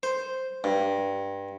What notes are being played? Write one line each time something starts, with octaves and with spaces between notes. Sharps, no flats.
C5
G2